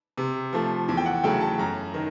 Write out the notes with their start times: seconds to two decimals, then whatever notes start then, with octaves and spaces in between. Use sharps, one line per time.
0.18 C3
0.53 F3 A3
0.88 E2
0.97 G5
1.06 F#5
1.24 C#3 F#3 A3 G5
1.41 A5
1.58 F#2 A#5
1.94 D#3